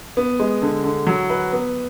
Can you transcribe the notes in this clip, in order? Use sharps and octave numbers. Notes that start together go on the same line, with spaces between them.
B3
G#3
D3
D3
F#3
B4
B3